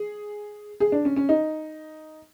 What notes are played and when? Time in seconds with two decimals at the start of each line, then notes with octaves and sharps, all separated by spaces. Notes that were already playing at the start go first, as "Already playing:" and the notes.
Already playing: G#4
0.80 G#4
0.92 D4
1.05 C#4
1.16 C#4
1.29 D#4